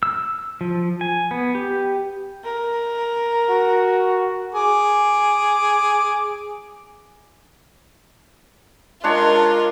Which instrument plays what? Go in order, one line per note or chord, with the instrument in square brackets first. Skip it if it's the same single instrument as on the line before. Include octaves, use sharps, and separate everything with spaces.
[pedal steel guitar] E6
F3
G#5
B3
G4
[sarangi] A#4
[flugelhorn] F#4
[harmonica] G#4 D6
[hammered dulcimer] G#3 D4 C#5 [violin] F4 A#4